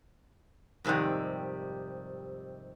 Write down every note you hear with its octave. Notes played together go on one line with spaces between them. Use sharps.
F2 G#2 C3 D#3 G3